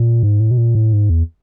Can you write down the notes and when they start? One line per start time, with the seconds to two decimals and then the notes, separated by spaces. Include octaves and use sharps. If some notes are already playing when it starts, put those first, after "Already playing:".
Already playing: A#2
0.23 G#2
0.40 A2
0.51 B2
0.58 A#2
0.75 A2
0.93 G#2
1.10 E2